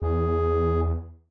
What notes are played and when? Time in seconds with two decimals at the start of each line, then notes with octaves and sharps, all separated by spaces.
0.02 E2 G#4